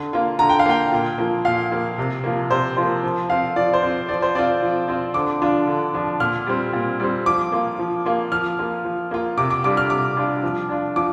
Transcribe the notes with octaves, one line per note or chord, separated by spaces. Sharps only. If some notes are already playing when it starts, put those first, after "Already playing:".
Already playing: D3
A#3 F4
D3 A#5
G5
F5
A#3 F4 G5
A#2
F3 A#3
A#2 F5
F3 A#3
C3
F3 A#3
C3 C5
F3 A#3 C5
F3
C4 F4 F5
F3 D5
C5
C4 F4
F3 D5
C5
C4 F4 D5
F3
C4 F4
D3 D6
F3 D4 F4
D3
F3 D4 F4
A#2 F6
G3 C4
A#2
G3 C4
F3 D6
A#3 F4
F3
A#3 F4
F3 F6
A#3 F4
F3
A#3 F4
C3 D6
D6
G3 D4 F4 D6
F6
C3 D6
G3 D4 F4
F3
D4 F4
F3 D6